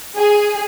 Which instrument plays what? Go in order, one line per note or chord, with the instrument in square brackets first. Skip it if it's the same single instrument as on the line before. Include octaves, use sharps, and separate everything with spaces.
[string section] G#4